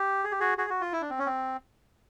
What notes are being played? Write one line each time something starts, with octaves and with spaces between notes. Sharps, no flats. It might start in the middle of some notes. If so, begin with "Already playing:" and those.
Already playing: G4
G#4
G4
F#4 G#4
F#4 G#4
F#4
F4
E4
D4
C4
C#4
C4